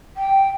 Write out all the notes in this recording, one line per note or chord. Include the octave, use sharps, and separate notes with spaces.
G5